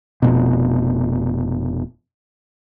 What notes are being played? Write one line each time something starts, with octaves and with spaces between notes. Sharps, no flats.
F1 B2